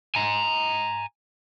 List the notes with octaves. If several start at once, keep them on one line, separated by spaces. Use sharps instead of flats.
G#5 A#5